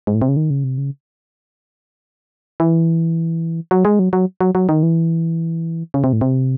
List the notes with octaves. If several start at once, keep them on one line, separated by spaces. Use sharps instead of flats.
G#2
A2
C3
C#3
D#3
C#3
C3
C#3
E3
F#3
G#3
F#3
F#3
F#3
F#3
D#3
E3
C#3
C3
A2
C3